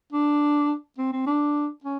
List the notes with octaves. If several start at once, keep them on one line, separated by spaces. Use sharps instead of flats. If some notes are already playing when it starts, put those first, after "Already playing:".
D4
C4
C4
D4
C#4